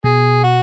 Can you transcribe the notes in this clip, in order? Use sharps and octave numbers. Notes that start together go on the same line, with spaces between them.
B2 G#4
F#4